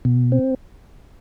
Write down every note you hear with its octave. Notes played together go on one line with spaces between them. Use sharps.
B2
C4